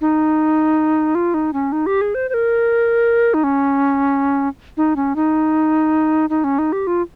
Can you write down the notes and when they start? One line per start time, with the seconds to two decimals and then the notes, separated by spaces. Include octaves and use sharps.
0.01 D#4
1.15 F4
1.34 D#4
1.53 C#4
1.72 D#4
1.86 G4
2.01 G#4
2.15 C5
2.29 C5
2.34 A#4
3.34 D#4
3.44 C#4
4.77 D#4
4.96 C#4
5.16 D#4
6.30 D#4
6.44 C#4
6.59 D#4
6.72 G4
6.87 F4